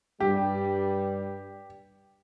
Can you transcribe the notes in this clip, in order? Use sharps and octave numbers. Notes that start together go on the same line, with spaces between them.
G2 G3 G4